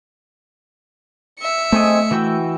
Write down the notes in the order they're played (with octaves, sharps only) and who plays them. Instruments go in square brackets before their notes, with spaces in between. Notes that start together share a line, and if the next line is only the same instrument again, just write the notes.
[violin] E5 C#7
[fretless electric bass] A3 [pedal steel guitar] C4 G#4 D#5
[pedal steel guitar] E3 F#4 G5